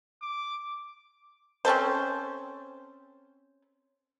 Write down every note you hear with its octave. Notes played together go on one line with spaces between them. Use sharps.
D6
C4 C#4 A4 C5